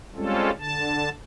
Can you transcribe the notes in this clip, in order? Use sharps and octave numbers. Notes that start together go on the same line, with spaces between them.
G3 G#3 C4 C#4 F4 A4
D3 A5